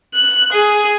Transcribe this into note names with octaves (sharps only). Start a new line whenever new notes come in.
F#6
G#4